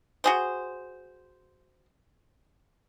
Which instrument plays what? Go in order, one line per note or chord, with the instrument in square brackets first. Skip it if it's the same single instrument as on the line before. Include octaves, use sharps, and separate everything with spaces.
[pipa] F#4 G#4 C5